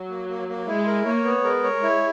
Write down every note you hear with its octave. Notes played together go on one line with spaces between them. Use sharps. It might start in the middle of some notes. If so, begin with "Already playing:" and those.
Already playing: F#3
A#3
A#3
A#3
G#3 E4
A#4
A#3 C#5
B3
G#3 A#4
C#5
E4